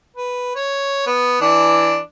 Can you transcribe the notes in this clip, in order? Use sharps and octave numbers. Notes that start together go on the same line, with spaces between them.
B4
C#5
B3
E3 D4 D5